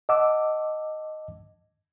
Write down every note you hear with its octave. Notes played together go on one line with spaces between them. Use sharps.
D#5 F#5 A5 D6 E6